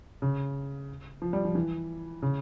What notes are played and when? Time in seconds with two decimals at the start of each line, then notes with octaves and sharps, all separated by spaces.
0.22 C#3
1.22 F3
1.33 G3
1.45 F3
1.55 E3
2.22 C#3